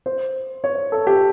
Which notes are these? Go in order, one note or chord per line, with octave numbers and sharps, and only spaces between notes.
C5
C#5
A4
G4